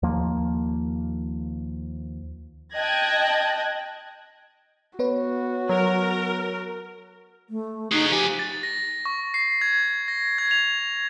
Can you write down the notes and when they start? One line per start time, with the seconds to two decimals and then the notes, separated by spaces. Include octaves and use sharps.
0.03 D#2 F3 A#3
2.74 D#5 G5 A5 F#6 G#6 A#6
4.99 B3 F#4 B4 C#5
5.69 F#3 A#4
7.50 A3
7.92 D#4 F#4 G#4
8.11 F3 G4 G#5
8.39 A6
8.63 A#6
9.05 C#6
9.34 C7
9.61 G#6
10.08 A#6
10.38 G#6
10.51 F7